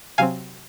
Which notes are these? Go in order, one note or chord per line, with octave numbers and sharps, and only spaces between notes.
C3 F#3 C4 F5 G#5